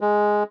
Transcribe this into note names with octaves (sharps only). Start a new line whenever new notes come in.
G#3